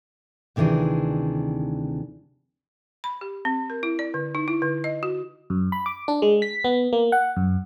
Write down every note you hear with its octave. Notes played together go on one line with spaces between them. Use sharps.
D2 C3 D#3 E3 D4 G#4
B5
G4
C4
A#4
E4
D5
D3
D#4
E4
D3
D#5
F#4
F#2
B5
D6
D4
G#3
B6
B3
A#3
F#5
F#2